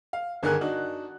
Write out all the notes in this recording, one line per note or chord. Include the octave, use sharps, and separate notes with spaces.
F5
G1 D3 D#3 G#4 A#4 F#6
D4 D#4 F#4